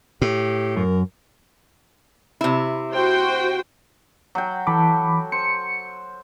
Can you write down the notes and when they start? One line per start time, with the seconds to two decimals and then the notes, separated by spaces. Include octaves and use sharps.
0.22 A2 G4
0.76 F#2 A#4
2.41 C3 E4
2.93 F#4 C5 G5
4.35 F#3 G5
4.67 E3 A4 B5 D6
5.32 C5 C#7